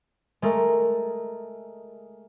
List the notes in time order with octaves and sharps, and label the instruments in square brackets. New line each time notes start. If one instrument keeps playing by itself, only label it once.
[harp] G#3 A3 A#4